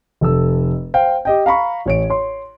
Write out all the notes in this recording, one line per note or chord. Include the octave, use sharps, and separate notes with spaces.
F1 A4 E6
C5 F5 G5
G4 D#5 G5
F5 A#5 B5 C#6
A1 C#5 D7
C#5 C6